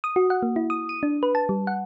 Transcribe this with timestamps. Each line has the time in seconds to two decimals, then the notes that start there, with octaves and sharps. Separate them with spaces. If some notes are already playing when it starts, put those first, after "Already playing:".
0.04 D#6
0.16 F#4
0.30 F#5
0.42 A#3
0.56 E4
0.70 D#6
0.89 D#7
1.03 D4
1.23 B4
1.35 A5
1.49 G3
1.67 F#5